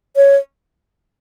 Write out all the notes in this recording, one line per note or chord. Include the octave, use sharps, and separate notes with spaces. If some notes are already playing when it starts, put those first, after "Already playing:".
C#5